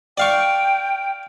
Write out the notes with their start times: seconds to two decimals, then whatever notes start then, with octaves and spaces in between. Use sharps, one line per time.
0.18 D5 F5 G5 C#6